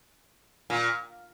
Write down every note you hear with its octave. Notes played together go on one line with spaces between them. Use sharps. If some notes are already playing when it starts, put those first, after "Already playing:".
A#2